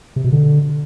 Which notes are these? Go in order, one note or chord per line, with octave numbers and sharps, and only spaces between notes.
C3
B2
D3